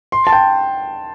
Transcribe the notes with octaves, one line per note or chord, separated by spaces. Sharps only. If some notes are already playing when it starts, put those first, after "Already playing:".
C6
A5
G5